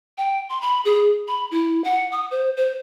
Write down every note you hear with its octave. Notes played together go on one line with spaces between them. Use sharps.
G5
C6
B5
G#4
B5
E4
F#5
D#6
C5
C5